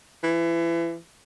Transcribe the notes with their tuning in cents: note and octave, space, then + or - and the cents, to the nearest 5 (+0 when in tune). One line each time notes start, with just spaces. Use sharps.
E3 +30